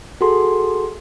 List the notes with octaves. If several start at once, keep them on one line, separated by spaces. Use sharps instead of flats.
F#4 G#4 A4 C6